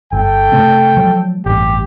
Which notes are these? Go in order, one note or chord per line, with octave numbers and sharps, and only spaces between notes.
G1 G2 A4 G5
C3 A3 C4
F3 F#3 G#3
A1 G2 G4